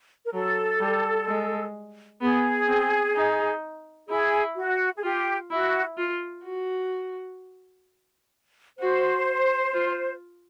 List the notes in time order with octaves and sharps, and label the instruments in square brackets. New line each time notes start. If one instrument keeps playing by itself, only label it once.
[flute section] A#4
[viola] F#3 [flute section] A4
[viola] G3
G#3
[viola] B3 [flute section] G#4
[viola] C4
D#4
[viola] E4 [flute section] G#4
[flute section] F#4
G#4
[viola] F4 [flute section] G4
[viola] E4 [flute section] F#4
[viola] F4
F#4
[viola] F#4 [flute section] C5
[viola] F4